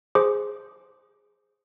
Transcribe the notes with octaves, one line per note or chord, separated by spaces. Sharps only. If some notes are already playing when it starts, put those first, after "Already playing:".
G#4 C5 D6